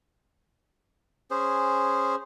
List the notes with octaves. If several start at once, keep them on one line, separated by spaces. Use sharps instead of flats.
C#4 G#4 C5